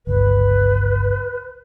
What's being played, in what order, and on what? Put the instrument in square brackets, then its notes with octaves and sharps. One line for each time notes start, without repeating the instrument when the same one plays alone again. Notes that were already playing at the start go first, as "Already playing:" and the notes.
[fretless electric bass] G1 C#2 [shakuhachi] B4